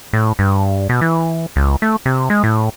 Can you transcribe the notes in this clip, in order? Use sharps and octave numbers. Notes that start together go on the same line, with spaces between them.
A2
G2
B2
E3
C#2
A3
C3
G#3
A2